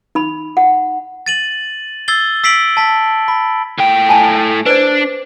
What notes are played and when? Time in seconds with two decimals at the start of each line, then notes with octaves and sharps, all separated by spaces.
0.15 D#4 B5
0.57 F#5
1.26 A6 D#7 F#7
2.08 E6 G#6 A6 C7 G7
2.44 E6 B6 C7 D7 F#7
2.77 A5 B6
3.28 B5
3.78 A2 G5
4.09 G#5 A5
4.66 D4 B4 C5 D5